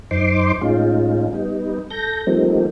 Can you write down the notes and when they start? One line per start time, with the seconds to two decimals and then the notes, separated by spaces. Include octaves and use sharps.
0.11 F#2 D#4 C5 C6 D6
0.61 A2 G#3 C#4 D#4 F4
1.33 G3 B3 D#4
1.90 A4 G6 A#6
2.27 F3 G3 A3 A#3 C4 D#4